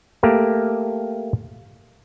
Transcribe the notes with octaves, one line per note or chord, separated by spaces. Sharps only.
A3 A#3 G4 A#4